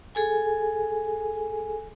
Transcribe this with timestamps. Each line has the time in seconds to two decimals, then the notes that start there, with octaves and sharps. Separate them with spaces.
0.15 G#4 A4 G#5